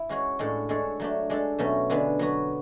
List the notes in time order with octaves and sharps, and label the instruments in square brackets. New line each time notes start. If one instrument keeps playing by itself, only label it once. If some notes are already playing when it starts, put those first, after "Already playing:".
Already playing: [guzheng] E4
G#3 C#4 F#4 C#5
A2 G#3 D4 A4 C#5
G#3 D4 A4 C#5
F#3 A3 D4
G#3 D4 A4
B2 F#3 A3 C#4
D3 G#3 B3 D4
F#3 B3 F#4